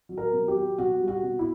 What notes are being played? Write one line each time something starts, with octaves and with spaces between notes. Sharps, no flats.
F#3
A#4
B2
G4
F#3
B2 F#4
G3
F#4
B2
E4